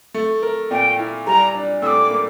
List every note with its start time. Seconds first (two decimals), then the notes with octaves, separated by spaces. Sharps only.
0.14 A3
0.43 A#4
0.71 A#2 G5
0.99 E4
1.27 G3 A#5
1.54 D4
1.82 A2 E6
1.87 D6
2.11 A#3